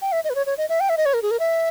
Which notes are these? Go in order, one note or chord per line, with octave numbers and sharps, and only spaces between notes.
G5
E5
D#5
B4
C#5
C#5
D#5
E5
G5
E5
D#5
C#5
A#4
G#4
A#4
E5